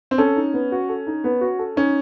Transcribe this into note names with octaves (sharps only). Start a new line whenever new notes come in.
C4
C#4 A4
D#4
B3
F#4
A4
D#4
B3
F#4
A4
C#4 D#4